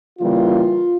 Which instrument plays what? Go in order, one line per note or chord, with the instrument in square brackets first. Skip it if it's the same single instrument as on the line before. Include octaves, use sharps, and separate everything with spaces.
[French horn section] C#3 E3 G3 A#3 F4